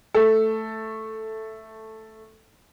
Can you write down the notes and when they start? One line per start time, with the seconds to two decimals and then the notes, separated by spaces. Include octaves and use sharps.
0.14 A3 A4